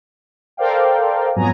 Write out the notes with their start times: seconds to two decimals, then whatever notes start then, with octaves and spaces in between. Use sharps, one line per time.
0.57 A4 A#4 C5 D5 F5 G5
1.35 F2 G#2 F#3 B3 G#5 A#5